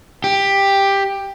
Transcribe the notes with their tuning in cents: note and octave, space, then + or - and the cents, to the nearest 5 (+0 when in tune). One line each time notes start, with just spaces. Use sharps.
G4 +10